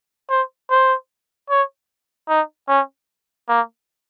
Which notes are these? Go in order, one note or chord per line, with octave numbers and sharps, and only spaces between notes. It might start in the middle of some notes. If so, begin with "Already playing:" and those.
C5
C5
C#5
D#4
C#4
A#3